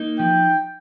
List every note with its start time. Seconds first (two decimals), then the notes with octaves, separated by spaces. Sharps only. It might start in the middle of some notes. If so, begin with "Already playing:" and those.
Already playing: A#3 D#4
0.19 F3 G5